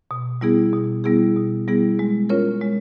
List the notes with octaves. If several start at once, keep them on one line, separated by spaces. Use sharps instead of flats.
B2
G3 B3 E4 G#4
B2
G3 B3 E4 G#4
B2
G3 B3 E4 G#4
G#3
C#4 F4 A#4 C#5
G#3